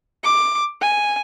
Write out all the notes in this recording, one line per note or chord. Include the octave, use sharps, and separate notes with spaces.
D6
G#5